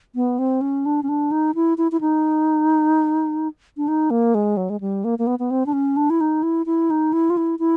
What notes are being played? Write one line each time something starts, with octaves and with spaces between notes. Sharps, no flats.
B3
C4
C#4
D4
C#4
D4
D#4
E4
E4
E4
D#4
D4
D#4
A#3
G#3
F#3
G#3
G3
A#3
A#3
B3
B3
C4
D4
C#4
D4
E4
D#4
E4
E4
D#4
E4
F4
E4
E4